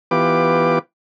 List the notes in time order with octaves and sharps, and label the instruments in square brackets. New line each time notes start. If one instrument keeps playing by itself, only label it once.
[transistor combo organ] E3 B3 F4 G4 B4 D6